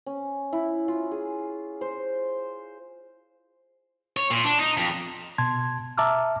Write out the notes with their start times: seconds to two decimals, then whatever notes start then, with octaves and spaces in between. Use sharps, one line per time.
0.06 C#4
0.53 E4
0.88 F4
1.11 G#4
1.81 C5
4.17 C#5
4.31 A#2
4.45 D4
4.59 D#4
4.78 F2
5.38 B2 A5 C6 G#6
5.98 E5 A5 A#5 D6 E6 F6